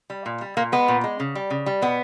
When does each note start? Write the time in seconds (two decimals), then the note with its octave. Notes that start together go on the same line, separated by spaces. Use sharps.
0.10 G3
0.26 A#2
0.41 G3
0.57 A#2 A#3
0.72 G#3 B3
0.88 A#2
1.04 G#3
1.20 C#3
1.35 G3
1.50 C#3
1.66 G3
1.82 B2 B3